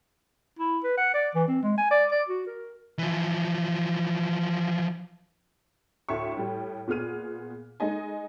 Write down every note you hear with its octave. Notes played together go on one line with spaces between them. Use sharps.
E4
B4
F#5
D5
E3
C4
G#3
G#5
D5
D5
F#4
A#4
E3 F3
D2 A2 E5 C#6
A2 G3
A#2 B3 G#4 F6 D#7
G#3 D#4 D#5 G#5